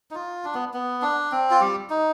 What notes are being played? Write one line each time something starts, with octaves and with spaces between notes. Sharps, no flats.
D#4
F4
D4
B3
B3
D4
C4
F4
G3 G4
D#4